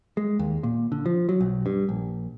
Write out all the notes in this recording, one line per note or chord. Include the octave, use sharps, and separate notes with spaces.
G#3
D#2
A#2
D3
F3
F#3
B1
G2
A#1